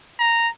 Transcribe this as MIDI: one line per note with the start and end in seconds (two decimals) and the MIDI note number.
0.19 0.48 82